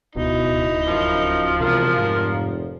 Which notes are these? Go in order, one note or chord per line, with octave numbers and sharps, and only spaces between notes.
D1 C#2 B2 D#4 E4
F#2 F3
E1 C3 F4 A#4
F1 G#2